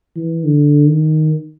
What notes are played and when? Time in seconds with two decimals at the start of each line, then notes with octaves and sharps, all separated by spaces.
0.16 E3
0.44 D3
0.87 D#3